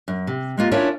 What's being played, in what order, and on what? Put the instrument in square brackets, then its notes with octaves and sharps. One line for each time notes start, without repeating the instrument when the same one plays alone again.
[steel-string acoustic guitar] F#2
C3
G#3 A#3 F4
C#4 D4 E4 F4 A#4 C#5